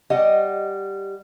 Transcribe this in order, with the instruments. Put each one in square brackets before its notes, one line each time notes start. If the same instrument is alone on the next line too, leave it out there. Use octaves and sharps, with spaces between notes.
[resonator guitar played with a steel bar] G3 D#5 F#5